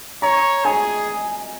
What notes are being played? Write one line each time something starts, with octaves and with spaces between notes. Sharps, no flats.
C#5 A#5
G#4 G#5